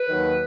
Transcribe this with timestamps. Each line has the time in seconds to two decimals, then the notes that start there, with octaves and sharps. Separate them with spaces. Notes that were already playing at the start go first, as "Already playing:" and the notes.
Already playing: B4
0.08 D#2 D#3 F#3